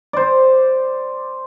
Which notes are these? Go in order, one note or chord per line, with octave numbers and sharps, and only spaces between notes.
C5 D5